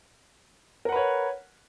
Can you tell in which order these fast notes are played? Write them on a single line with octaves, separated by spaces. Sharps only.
A#4 F#5 B4 C#5